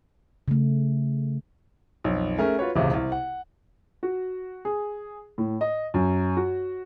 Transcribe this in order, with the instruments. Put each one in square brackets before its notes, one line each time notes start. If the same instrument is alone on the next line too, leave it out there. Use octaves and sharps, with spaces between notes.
[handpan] C#3 A3
[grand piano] B1 F2
A3 C#4 G#4 A#4
F4 F#4 B4 C#5
E1 C#2 A2 C3
C2
F#5
F#4
G#4
A2
D#5
F#2
F#4